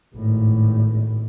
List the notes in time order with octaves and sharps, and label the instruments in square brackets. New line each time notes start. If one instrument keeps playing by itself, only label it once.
[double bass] G#1 A2